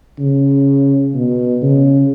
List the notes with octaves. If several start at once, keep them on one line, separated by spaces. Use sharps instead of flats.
C#3
B2
C#3